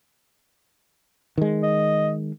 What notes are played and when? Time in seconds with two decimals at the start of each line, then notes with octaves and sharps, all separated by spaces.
1.38 D#3 G#3
1.63 D#5